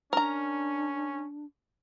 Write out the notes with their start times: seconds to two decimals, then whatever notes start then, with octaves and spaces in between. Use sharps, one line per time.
0.13 C#4 D4 A#4 A#5